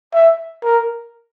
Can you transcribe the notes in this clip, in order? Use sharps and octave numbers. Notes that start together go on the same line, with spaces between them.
E5
A#4